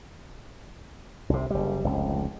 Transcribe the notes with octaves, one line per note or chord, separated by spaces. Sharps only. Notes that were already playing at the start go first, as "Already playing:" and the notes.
C2 C3
F#1 G3
F1 C#2